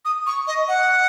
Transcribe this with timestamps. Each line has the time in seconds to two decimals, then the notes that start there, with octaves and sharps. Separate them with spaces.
0.05 D#6
0.27 C#6
0.47 D#5
0.68 F#5